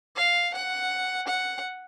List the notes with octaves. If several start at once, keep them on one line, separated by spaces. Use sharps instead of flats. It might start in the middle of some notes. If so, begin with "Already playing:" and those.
F5
F#5
F#5